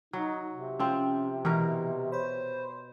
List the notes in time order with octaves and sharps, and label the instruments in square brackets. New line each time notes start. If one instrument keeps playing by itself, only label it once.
[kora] F#3 [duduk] D#4
[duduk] C3
[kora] F3 C4 [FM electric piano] C#4
[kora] B2 A#4 [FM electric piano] E3
[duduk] C5 [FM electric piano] C#5 B5